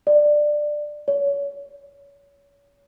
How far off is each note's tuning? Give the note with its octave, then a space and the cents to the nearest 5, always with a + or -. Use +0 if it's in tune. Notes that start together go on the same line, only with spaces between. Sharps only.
D5 +15
C#5 +30